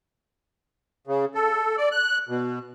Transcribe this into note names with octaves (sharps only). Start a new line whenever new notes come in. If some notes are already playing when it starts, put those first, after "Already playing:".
C#3
A4
D5
F#6
B2